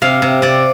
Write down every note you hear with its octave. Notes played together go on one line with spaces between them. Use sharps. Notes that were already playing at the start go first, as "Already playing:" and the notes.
C3 F5
C3
C3 D5